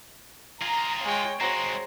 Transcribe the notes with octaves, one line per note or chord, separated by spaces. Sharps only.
F4 G#4 A#5
G#3 C#5 G5
G#3 C4 F#4 G#4 C5 A#5